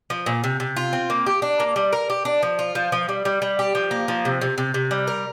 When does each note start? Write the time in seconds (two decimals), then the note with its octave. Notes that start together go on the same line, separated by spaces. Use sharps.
0.10 F3
0.26 A#2
0.44 C3
0.60 C3
0.76 F4
0.93 C4
1.10 A#3
1.26 G4
1.42 D4
1.60 A#3
1.76 G3
1.93 A#4
2.10 G4
2.25 D4
2.43 F3
2.59 F4
2.75 F3
2.92 F3
3.09 G3
3.25 G3
3.42 G3
3.59 G4
3.75 F3
3.91 A#3
4.08 F3
4.25 C3
4.41 C3
4.58 C3
4.74 C3
4.91 G3
5.07 A#4